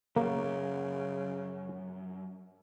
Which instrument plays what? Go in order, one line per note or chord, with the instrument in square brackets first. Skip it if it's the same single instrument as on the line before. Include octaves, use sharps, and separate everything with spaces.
[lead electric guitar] F#2 [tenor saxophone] C#3 [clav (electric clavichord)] A#3